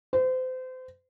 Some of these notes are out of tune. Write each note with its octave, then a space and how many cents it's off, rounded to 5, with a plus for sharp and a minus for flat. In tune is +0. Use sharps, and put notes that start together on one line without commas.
C5 -30